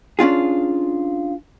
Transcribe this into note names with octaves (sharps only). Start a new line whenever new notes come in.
C#4 D4 F4 G#4